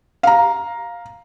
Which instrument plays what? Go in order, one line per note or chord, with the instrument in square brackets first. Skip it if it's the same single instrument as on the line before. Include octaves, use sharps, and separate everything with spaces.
[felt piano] F5 A#5